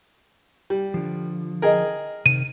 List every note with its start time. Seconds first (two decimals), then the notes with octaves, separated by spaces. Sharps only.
0.70 G3
0.94 D3 F3
1.62 G#4 A#4 D#5 G5
2.26 C3 D#3 D#7